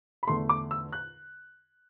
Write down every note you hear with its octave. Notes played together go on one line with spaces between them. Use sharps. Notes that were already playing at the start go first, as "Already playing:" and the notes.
B5
E2 D3 A3 C6
D6
E6
F#6